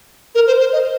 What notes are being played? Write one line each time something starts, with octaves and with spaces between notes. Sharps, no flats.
A#4
C5
C5
D#5